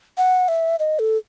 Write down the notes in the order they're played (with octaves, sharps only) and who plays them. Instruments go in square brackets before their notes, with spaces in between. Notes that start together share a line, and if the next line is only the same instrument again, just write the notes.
[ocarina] F#5
E5
D#5
A4